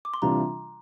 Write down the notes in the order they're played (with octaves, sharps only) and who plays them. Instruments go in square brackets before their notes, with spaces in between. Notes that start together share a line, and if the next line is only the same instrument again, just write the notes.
[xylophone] D6
C6
[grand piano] C3 E3 G3 D4 F4 [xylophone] A#5